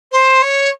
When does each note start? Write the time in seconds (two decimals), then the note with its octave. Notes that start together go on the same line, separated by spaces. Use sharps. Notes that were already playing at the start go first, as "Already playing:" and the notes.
0.12 C5
0.42 C#5